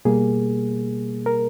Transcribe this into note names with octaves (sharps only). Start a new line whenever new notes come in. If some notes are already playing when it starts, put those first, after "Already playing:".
B2 G3 A#3 G#4
A#4